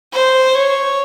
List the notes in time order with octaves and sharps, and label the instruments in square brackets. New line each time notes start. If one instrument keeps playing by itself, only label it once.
[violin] C5
C#5